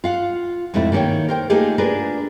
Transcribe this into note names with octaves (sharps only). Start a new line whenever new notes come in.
F4 F5 F#5
F2 G#2 C3 A3 E4
D#3 A#3 G4 C#5 G5
A#4 C5 G5
A3 A#3 D#4 F4 G4 G#4
D4 F4 G#4 A#4 B4